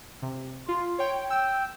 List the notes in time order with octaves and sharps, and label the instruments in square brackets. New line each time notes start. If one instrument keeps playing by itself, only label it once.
[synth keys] C3
[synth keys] F4 [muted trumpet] C6
[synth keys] C#5 G5
[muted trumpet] G5 [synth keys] E6